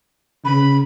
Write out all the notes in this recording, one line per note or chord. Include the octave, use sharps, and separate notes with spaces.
C#3 B5